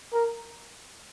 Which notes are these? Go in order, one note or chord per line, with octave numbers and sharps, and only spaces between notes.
A#4